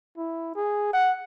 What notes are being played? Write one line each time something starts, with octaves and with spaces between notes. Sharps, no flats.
E4
G#4
F#5